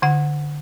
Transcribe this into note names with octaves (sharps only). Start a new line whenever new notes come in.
D3 F#5